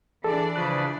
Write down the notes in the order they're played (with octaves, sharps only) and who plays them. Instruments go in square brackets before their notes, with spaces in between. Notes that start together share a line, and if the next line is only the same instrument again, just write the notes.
[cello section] E3 D4 D5 [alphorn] G#4 [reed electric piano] A4
[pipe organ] C#3 B4 [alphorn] F3 [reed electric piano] F#6